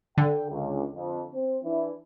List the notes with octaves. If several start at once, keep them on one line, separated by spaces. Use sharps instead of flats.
D3 A4 G5
C#2
F2
C4
E3 D4 E4